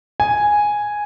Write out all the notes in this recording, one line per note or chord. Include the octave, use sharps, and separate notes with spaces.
G#5